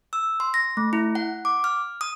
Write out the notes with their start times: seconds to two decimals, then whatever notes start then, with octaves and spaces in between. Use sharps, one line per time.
0.13 E6
0.40 C6
0.54 A#6
0.77 A3
0.93 E4
1.15 F#5
1.45 D6
1.64 F6
2.01 D#6